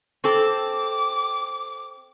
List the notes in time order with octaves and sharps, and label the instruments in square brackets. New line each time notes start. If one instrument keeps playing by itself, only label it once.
[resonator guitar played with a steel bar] C4 A4 [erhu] D6